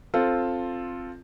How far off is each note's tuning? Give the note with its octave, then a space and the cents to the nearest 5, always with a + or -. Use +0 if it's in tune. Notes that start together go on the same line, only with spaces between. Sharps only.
C4 +10 F4 +0 A4 +0